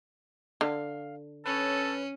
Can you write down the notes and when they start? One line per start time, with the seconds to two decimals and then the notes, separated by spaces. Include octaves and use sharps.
0.61 D3 F5
1.46 C#4 A4 B4 C#5